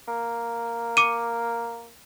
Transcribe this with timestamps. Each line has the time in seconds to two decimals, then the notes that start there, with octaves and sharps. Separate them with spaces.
0.08 A#3
0.97 D6 C#7 D#7